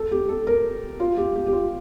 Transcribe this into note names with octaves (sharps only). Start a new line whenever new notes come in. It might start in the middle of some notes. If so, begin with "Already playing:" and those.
Already playing: A4
G4
A4
A#4
F4
G4
G4
G4
F4